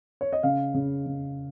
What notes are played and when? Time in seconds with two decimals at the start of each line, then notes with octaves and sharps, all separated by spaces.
0.21 C#5
0.33 D#5
0.43 C#3 F5
0.74 C#3
1.06 C#3